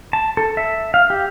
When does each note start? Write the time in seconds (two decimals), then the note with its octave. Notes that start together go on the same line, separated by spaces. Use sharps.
0.13 A5
0.37 A4
0.57 E5
0.94 F5
1.10 G4